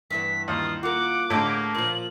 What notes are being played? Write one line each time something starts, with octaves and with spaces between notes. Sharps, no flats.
G2 E3 B3 B6
D#2 F4 D#6
A#3 F4 F#5 D6
D2 A2 D3 G#3 A#3
A#2 F3 F#7